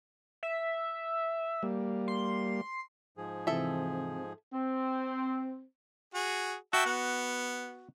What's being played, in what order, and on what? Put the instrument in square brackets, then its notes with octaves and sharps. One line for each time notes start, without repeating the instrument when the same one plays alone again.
[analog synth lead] E5
[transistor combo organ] G3 A#3
[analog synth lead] C6
[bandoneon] G#2 F3 G#4
[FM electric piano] C3 E3 [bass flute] C4 [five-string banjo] A4 E5
[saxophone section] C4
[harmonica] F#4 G#4
[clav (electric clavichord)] F#4 [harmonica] E5 G5 A5
[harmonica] B3